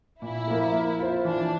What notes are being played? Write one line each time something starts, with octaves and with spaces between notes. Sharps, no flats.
A#2 E4
F3 A#3 F4 A#4
A#3
F4 C5
E3 D4